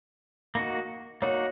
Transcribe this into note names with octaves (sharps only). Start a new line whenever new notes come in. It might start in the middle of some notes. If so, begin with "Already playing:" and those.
A#3 D#4 F#4
A#3 D#4 F#4 C#5